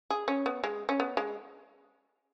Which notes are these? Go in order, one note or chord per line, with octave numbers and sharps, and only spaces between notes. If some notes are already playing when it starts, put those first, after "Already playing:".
G#4
C#4
B3
G#3
C#4
B3
G#3